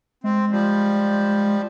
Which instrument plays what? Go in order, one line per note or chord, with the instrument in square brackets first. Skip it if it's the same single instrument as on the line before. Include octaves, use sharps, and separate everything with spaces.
[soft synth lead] G#3 [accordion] C4
[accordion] F3 G3